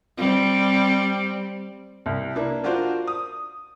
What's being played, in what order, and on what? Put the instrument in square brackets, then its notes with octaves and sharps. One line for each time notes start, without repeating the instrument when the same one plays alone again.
[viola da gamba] G3 C4
[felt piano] C2
A#3 D4 E4
D4 F4 F#4 A#4 C5 D5
D#6